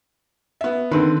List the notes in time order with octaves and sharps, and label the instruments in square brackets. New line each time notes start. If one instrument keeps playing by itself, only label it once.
[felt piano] B3 E5
[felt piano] D3 C4 B4 [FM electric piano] D#3